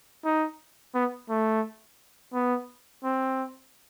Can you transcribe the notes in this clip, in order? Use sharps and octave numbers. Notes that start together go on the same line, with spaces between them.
D#4
B3
A3
B3
C4